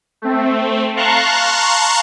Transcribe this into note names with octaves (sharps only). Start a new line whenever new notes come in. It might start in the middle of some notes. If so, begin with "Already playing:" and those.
A3 C4
F5 A5 A#5 C6 C#6 F#6